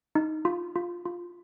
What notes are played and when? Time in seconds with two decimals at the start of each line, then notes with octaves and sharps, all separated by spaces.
0.15 D#4
0.45 F4
0.76 F4
1.06 F4